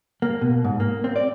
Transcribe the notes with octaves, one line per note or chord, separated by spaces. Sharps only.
A#3
B2
G#2
A#3
C4
D5